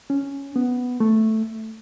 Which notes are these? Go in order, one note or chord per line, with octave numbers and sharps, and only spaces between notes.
C#4
B3
A3